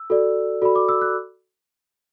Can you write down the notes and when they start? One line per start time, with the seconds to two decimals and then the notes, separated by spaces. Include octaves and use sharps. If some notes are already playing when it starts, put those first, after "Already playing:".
Already playing: E6
0.10 F#4 A4 D5
0.62 F#4 A4 D5 B5
0.76 D6
0.89 E6
1.01 F#6